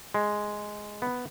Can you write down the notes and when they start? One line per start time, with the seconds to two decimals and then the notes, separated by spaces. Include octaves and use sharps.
0.14 G#3
1.02 B3